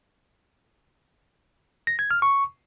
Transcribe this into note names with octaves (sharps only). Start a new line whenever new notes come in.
A#6
G#6
F6
C#6